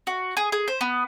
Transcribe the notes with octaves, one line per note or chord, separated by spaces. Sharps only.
F#4
G#4
G#4
C5
B3